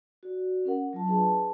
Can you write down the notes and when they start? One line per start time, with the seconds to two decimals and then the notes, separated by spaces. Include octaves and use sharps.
0.23 F#4 D5
0.65 C#4 A#4 F#5
0.93 F#3 F4 A5
1.08 D4 G#4 B4 A5